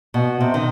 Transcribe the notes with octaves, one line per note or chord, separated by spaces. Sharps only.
B2
C3
D#3